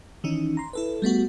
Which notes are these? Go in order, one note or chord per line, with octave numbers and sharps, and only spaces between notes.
D#3 E3 C#4 D#4
A#5 C6
E4 A4 B4
G3 A3 B3 F#4